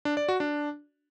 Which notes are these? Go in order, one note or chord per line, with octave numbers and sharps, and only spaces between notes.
D4
D5
F#4
D4